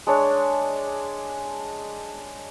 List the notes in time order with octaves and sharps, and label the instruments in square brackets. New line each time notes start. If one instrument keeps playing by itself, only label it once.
[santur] G#3 D4 C#5